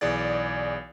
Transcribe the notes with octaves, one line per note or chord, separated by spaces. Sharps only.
B1 E3 G#4 D5 A6